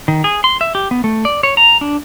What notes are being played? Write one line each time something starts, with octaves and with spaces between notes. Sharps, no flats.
D#3
G#4
C6
E5
G4
B3
A3
D5
C#5
A#5
D4